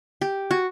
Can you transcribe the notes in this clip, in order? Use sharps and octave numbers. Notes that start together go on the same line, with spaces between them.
G4
F#4